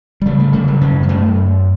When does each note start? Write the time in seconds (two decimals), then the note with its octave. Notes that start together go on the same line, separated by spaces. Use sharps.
0.22 G3
0.26 C#3 A3
0.40 A3
0.53 C#3 G3
0.68 F#3
0.81 F#2 C#4
1.03 G3
1.09 F#2 A3